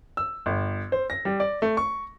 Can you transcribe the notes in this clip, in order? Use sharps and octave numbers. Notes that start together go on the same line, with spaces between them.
E6
G1
C5
A#6
G3
D5
A3
C#6